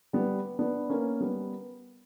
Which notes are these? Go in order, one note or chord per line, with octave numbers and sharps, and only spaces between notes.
G3 B3
B3 D4
A#3 C#4
G3 B3